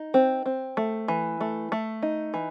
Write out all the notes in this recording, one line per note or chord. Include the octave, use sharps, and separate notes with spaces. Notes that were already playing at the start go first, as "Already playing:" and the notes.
Already playing: D#4
C4
C4
A3
E3
A3
A3
D#4
E3